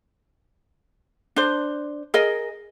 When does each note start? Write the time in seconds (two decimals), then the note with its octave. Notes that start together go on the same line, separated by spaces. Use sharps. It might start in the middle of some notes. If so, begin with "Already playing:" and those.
1.36 D4 C5
2.14 G#4 A#4 D#5